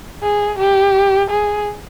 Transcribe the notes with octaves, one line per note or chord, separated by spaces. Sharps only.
G#4
G4
G#4